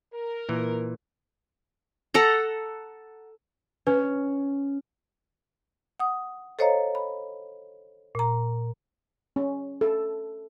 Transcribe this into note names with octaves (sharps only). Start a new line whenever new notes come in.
A#4
A#2 E3
A4 F#5 A#5
C#4 B4
F#5 D#6
A4 C5 C#5 D#5 F5 A#5
B5
A#2 A#5
C#4
A4